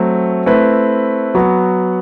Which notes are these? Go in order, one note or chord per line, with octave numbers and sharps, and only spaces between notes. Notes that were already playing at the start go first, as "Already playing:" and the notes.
Already playing: F#3 A3 C4
A3 C4 E4 B4
F#3 B3 F#4